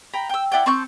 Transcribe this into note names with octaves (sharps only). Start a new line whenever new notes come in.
G5 A#5 B5
G5 E6
E4 D5 F#5 G5
C4 A5 C#6 G6